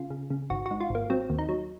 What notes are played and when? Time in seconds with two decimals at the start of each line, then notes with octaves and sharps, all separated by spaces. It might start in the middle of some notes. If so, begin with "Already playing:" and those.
Already playing: C#3 F4
0.10 C#3
0.30 C#3
0.50 G#1 F#4
0.66 G#2 F#4
0.80 F4
0.90 G#1 A#3
1.10 F#3 C4
1.30 D#2
1.39 D#4
1.49 F#3